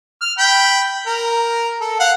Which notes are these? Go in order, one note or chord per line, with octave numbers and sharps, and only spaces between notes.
F6
G5 B5
A#4
A4
F5 F#5